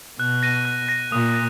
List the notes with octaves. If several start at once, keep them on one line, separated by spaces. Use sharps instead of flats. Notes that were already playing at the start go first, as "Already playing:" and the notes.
B2 F#6
A#6 D#7
F#6
A#6 D#7
A#2 D#6
A#6